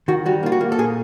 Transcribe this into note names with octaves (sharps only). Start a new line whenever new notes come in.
D#3 F#4
G3 F#4
A#3 F4
F#4
A#3
A4
A#2 G#4